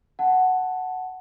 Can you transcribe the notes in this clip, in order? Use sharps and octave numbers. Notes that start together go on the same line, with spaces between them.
F#5 A5